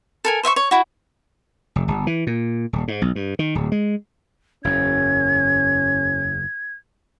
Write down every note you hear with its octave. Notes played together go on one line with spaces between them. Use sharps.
A4 A#4 G#5
C5 E5 F5 C#6
C#5
E4 F#4
F1
G1
E3
A#2
D#1
G#2
B1
G2
D#3
D1
G#3
F#1 E2 C#4 G#6